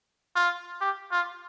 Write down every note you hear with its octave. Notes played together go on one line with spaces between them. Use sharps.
F4
G4
F4